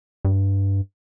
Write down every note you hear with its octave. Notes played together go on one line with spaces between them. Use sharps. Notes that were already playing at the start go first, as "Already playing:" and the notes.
G2